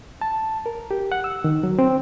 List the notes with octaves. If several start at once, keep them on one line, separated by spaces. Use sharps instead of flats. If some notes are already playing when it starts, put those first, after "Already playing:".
A5
A#4
G4
F#5
E6
D#3
F#3
C4